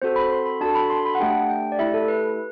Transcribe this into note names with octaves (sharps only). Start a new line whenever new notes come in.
C4 F#4 A4 C5
B5
B5
C6
B5
D4 F#4 A4 A5
B5
C6
B5
F#5
A3 D4 G4 G5
G5
D5
A3 E4 G4 E5
A4
B4